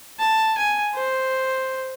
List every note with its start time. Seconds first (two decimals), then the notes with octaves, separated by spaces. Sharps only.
0.20 A5
0.57 G#5
0.94 C5